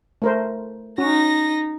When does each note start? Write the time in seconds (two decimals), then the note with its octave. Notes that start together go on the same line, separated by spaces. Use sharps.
0.22 A3 A#4 C5
0.98 C#4 D#4 F#4 A#6